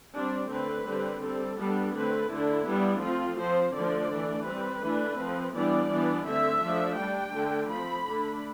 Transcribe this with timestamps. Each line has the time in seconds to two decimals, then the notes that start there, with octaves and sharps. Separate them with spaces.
0.15 G3 C4 D4
0.51 D3 A3 C4 B4
0.88 D3 G3 C4
1.23 G3 C4 A4
1.59 G3 B3 D4
1.95 D3 A3 C4 B4
2.31 D3 A3 D4 E4
2.67 G3 B3 D4
3.03 F3 A3 C4 F4
3.39 F3 C4 C5
3.75 D3 F3 A3 D4 D5
4.11 E3 A3 D4
4.47 G3 C4 B4
4.82 E3 A3 D4
5.18 F3 C4
5.54 E3 G3 B3 D4 D5
5.91 E3 B3 D4
6.26 D3 A3 C4 E5
6.63 F3 A3 D4
6.98 G3 D4 G5
7.34 D3 A3 D4
7.70 F3 C4 B5
8.06 D3 A3 D4